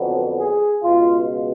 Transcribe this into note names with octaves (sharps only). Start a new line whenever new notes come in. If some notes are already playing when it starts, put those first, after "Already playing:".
Already playing: F2 D3 F#3 B3
G#4
C#2 B2 G#3 F4